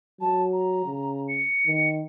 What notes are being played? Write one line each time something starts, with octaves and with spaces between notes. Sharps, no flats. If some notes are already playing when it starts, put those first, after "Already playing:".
F#3 A5
A#5
C#3
C#7
D#3